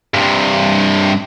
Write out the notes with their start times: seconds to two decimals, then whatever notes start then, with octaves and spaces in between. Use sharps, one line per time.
0.14 G2 C3